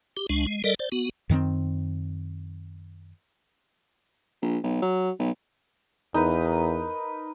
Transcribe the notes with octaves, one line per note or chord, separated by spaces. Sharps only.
G4
C#2 G#3 D4
G#3
G3 A4 A#4 D5 D#5
C5 D5
B3 F#4
F#2 D#3 B3 C4
A#1
B1
F#3
B1
E2 D#4 A#4 B4